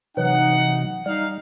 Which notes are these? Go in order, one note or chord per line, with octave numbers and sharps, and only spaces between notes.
C3 E3 F#3 D#4 F#5
G3 D#4 F5